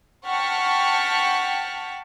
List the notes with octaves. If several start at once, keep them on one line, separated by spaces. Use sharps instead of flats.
F#5 G5 A5 C#6 F6 B6